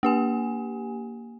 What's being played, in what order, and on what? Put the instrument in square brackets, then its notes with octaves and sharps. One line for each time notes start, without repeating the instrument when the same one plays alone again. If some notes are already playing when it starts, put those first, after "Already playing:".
[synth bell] A#3 G4 G#5